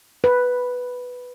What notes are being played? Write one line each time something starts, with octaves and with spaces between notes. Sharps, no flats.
B4